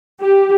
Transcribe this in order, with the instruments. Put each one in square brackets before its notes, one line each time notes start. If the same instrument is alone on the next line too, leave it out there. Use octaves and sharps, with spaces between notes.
[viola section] G4